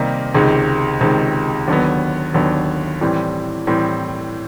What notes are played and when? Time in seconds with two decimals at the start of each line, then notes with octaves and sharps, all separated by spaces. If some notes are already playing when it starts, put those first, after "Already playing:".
Already playing: C3 D#3 G3 A#3 D#4
0.34 C#2 C3 D#3 G#3
1.01 C#2 C3 D#3 G#3
1.68 D#2 D3 F#3 B3
2.34 D#2 D3 F#3 B3
3.01 A2 E3 G3 C4
3.67 A2 E3 G3 C4